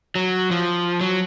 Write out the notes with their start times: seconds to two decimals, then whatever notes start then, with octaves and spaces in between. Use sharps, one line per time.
0.15 F#3
0.51 F3
1.01 F#3